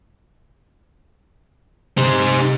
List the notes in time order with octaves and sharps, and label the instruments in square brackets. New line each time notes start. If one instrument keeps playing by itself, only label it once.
[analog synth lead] C3 [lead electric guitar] D#4 C5